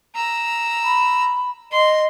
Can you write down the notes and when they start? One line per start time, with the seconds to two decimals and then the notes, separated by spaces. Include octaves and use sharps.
0.15 A#5 E6
0.84 B5
1.72 D#5 C6